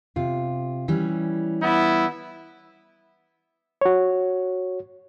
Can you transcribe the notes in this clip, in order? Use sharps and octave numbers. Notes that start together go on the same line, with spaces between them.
C3 F4
E3 G3 C#4
B3 E4
F#4 C#5